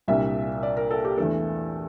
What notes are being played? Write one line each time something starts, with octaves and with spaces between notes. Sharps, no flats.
C2 A#2 G3 D4 E5
D5
A#4
A4
G4
E2 E3 A3 D4 A4